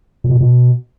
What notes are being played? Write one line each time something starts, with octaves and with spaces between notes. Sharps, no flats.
A#2
B2
A#2
B2